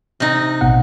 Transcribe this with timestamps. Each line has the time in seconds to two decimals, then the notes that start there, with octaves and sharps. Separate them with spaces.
0.20 C3 D#4
0.61 A1 B2 F#5